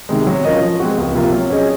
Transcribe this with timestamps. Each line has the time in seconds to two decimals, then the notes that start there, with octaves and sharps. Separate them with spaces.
0.09 C3 D#3 G#3
0.27 F#3
0.45 C#4 F4 A#4 D#5
0.62 F3
0.80 G#3 C4 F#4
0.98 C#2
1.15 C3 F3 A#3 F4
1.33 F#3
1.50 C#4 G#4 D#5